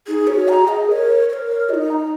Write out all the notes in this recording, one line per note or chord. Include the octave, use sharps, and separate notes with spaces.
D#4 G#4
G#4 C#5
F#4
A#5
G#4
D#5
A#4 C#5 D#5
C#5
A#4
C#5
D#4 F4 D#5
A#5